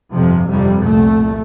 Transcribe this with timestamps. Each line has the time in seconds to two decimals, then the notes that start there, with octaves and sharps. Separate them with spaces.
0.12 G1 F2 C3 F3
0.48 G1 F2 C3 G3
0.83 C2 A#2 A3